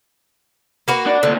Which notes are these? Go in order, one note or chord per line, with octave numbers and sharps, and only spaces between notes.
A#3 F#4 B4
D4 D5
D2 A#2 D3